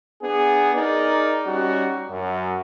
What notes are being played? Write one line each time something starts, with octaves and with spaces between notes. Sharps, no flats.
B3 D4 G#4
D#4 G#4 A#4 D5
G3 C#4 D#4 F#4
F#2